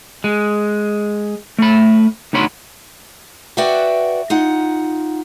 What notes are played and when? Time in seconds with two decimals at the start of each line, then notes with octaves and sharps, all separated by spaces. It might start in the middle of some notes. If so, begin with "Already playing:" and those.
0.24 G#3
1.58 A3 B5
2.33 D2 D#4 C#5 B5 C6
3.57 F#4 B4 D5 E5 F#5 G5
4.30 D#4 F4 F#5